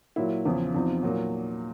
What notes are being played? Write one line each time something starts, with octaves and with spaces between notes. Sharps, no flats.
A#2 F#3 E4
E2 C#3 F3
E2 C3 F3 D#4
A#2 F#3